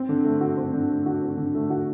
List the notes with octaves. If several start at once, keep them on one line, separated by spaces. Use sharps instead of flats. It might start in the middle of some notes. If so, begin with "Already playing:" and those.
Already playing: C4
D3
A3
F#4
C4
D3
A3
F#4
C4
D3
A3
F#4